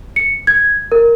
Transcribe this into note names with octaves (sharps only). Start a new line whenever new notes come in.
C#7
G#6
A#4